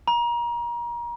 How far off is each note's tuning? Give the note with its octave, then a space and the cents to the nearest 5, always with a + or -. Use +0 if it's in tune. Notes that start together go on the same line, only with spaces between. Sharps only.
A#5 +30